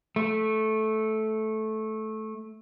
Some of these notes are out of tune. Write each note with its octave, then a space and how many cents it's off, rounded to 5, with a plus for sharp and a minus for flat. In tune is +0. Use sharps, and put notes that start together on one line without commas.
A3 -10